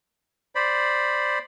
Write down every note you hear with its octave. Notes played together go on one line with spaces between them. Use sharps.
C5 D5 B5